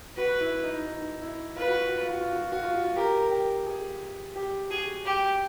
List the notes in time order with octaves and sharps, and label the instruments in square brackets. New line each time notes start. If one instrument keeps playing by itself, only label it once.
[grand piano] F#4 [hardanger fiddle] B4
[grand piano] E4
D#4
D#4
E4
[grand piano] F4 [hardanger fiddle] B4
[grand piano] F#4
F4
F#4
F4
F#4
F4
F#4
F4
F#4
F4
F#4
F4
[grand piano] G4 [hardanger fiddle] A#4
[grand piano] G4
G#4
G4
[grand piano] F#4 [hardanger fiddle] G#4
[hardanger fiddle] G4